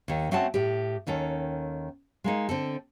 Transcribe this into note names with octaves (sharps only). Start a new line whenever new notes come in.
D#2 D#3
A3 C4 C#4 F#4 F#5 A5
A2 G4
D#2 D#3 C#4 A4
G#3 A#3 D#4
D3 C4 A4